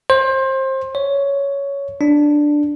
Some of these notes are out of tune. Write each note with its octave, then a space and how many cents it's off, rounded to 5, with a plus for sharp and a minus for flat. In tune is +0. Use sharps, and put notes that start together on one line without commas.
C5 +25
C#5 +10
D4 +5